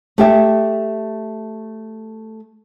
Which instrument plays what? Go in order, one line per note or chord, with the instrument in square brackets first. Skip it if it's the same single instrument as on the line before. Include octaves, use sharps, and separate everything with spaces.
[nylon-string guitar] A3 G4 E5